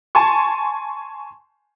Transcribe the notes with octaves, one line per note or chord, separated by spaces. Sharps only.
G#5 A5 C6 C#6